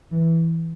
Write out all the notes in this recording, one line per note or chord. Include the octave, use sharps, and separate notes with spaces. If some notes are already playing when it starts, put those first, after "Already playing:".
E3